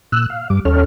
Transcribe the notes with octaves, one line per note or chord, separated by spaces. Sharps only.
A#2 E6 F#6
F5
G2 G3 D6
D#2 C#4 A4 C#5 F6